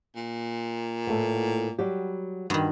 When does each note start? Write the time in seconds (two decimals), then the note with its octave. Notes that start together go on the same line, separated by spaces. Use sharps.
0.16 A#2
1.07 A2 A3 B3
1.79 F#3 G3 G4
2.50 G2 D#3 F#4